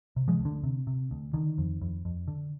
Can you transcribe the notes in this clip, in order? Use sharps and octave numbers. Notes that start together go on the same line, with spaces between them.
C3
F3 G#3
D2
D3
C3
C3
D2
D3 D#3
F2
F2
F2
D3